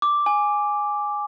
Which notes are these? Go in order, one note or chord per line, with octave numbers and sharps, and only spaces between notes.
D6
G#5